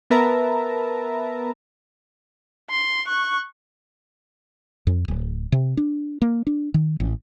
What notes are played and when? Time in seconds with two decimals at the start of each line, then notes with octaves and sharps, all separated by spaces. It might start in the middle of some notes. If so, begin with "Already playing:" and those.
0.10 B3 A#4 B4 E5 A5 A#5
2.70 C6
3.07 C#6 F#6
4.87 F2
5.08 D1
5.52 C3
5.77 D4
6.22 A#3
6.47 D4
6.74 D#3
7.00 A1